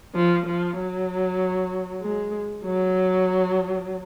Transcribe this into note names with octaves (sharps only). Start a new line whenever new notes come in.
F3
F3
F#3
G#3
F#3